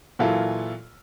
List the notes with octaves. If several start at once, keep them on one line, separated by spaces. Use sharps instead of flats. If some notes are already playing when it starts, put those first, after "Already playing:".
A#2 E3 F#3 E4 F4 A4